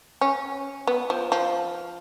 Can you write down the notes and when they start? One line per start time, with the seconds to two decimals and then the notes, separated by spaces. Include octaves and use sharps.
0.21 C#4
0.87 B3
1.10 F3
1.32 F3